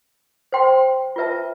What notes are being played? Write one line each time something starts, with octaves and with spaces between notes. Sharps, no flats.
C5 G5 C6
F4 B4 E5 A5